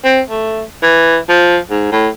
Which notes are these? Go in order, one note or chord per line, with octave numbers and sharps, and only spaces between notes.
C4
A3
E3
F3
G#2
A2